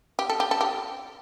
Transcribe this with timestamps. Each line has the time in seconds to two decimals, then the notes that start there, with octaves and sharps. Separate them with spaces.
0.19 G4
0.30 A4
0.40 G4
0.51 A4
0.61 G4